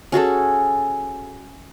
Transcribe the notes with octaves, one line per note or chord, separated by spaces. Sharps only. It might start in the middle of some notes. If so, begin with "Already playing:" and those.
C#4 F#4 G#4 A4